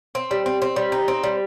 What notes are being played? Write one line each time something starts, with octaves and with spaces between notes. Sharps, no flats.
C4
G3
C4
C4
G3
D#4
C4
G3